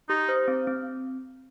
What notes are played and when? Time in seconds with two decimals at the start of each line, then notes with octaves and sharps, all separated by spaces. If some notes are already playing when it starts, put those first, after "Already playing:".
0.09 D#4 G4
0.29 C5
0.48 C4
0.67 C4